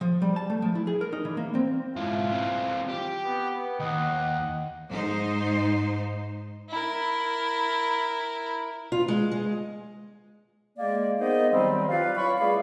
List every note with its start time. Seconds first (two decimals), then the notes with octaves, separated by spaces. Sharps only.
0.01 F3
0.22 G3
0.36 A5
0.50 A3
0.62 F3
0.75 E4
0.87 G#4
1.01 A#4
1.12 D#4
1.25 E3
1.37 A#3
1.55 C4
1.96 G#2 E4 F4
2.30 E3 C4
2.88 G4
3.24 B3
3.80 D#2 D#5 F#5
4.90 G#2 D#4 C5
6.69 E4 A#4
8.92 F4
9.08 G#3
9.32 G#3
10.78 G#3 A#3 D5
11.19 A#3 B3 D#4 G#4 C5 D#5
11.53 C3 D#3 F#3 G3 C4
11.90 F4 B4 D5 F5
12.17 C#4 E4 F4 F5 B5 C#6
12.39 E2 G3 A3 G#4 D5 F5